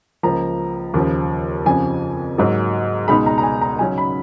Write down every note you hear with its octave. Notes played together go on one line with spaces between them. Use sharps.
C#2 C#3 F3 A#3 A#5
D#2 C#3 F3
F2 C#3 F3 G#5
G#2 F#3 A#3
C#2 B2 G#3 D#4 B5
A#5
A#5
G#5
A#5
C#3 F#3 C#4 G#5
B5